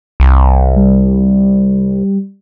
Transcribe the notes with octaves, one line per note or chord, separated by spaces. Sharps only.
C2
G3